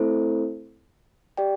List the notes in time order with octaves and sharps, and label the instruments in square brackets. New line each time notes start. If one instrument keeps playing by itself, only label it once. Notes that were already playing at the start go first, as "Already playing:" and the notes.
Already playing: [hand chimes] A3 C4 E4 A4 C5
G4 D5 G5